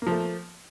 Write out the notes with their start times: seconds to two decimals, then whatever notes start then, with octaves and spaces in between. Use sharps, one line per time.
0.02 A#3
0.07 F3
0.11 A3